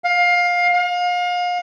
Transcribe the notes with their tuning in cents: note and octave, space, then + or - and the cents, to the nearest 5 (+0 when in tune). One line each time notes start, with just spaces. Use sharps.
F5 +20
F5 +35